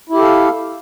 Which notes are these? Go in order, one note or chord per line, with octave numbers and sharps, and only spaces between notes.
E4 G4 A4 F5